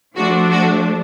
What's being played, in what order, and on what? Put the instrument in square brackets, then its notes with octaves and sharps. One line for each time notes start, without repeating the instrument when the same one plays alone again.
[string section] F3 A3 D4 F#4
F#4